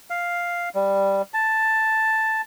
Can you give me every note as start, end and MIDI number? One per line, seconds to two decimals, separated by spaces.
0.10 0.69 77
0.75 1.22 55
1.34 2.41 81